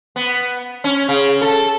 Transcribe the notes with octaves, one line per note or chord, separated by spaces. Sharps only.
B3
C#4
C#3
A4